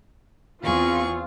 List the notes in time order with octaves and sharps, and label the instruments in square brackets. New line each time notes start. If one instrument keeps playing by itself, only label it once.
[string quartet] E2 G#4 C#6 [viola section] C4 F4